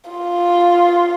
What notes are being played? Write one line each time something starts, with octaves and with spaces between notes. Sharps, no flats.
F4